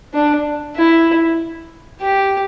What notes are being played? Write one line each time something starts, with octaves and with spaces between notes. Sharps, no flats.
D4
E4
G4